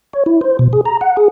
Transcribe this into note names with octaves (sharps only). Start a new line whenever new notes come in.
C#5
E4
C5
B2
G#4
A#5
F#5
G#4